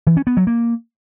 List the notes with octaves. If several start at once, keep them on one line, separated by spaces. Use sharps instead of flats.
E3
C#4
B3
F#3
A#3